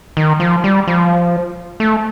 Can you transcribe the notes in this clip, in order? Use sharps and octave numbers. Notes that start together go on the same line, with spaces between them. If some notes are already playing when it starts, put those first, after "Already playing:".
D#3
F3
G3
F3
A3